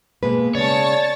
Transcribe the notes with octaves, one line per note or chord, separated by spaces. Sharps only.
B2 G#3 A#3 B4
C#3 G#3 C#5 D5 A5 C#6 A6